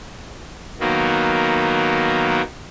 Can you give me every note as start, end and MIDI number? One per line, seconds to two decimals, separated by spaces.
0.80 2.42 51
0.80 2.42 54
0.80 2.42 58
0.80 2.42 59